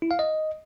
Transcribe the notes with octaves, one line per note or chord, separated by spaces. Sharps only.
E4
F5
D#5